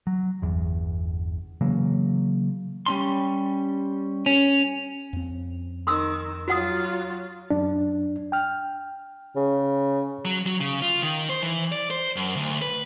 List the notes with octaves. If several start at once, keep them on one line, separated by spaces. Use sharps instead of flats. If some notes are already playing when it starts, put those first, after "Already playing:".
F#3
G1 E2
C#3 E3 F#3 A#3
G3 C#4 C6
C#4
F2 C4
D#3 C6 D#6 E6
F#3 F4 F#4 F#5 D#6
F#2 D4
G5 F6
C#3
F#3
F#3
C#3
F4
D#3
C5
E3
D5
C5
F#2
D2
B4